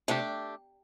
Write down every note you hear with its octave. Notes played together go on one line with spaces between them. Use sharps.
C3 A3 D4 G4